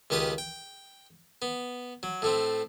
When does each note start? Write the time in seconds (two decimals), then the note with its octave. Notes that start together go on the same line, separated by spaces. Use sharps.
0.10 C#2 D#3 G4 B4 D#6
0.38 G5
1.42 B3
2.03 F#3
2.22 A2 A3 C4